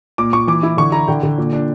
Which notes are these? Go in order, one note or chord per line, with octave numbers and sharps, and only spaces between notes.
A#2 D6
A#2 C#6
E3 D6
E4
D3 C#6
E4 A#5
D3 G5
D3
A#2
D4